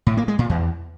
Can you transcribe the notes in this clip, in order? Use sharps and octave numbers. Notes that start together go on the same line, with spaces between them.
A2
A#3
G#3
A#2
E2